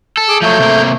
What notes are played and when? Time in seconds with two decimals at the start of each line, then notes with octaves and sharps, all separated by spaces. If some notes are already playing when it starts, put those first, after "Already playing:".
0.17 A4
0.29 G#4 D6
0.42 F3 F#3 A3 G6
0.59 C3 A#3